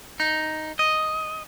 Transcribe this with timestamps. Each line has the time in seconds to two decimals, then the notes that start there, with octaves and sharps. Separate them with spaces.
0.20 D#4
0.79 D#5